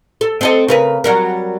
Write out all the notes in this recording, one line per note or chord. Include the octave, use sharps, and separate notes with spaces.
A4
C4 A4 D#5
C#3 A#4 B4
F#3 G3 A#4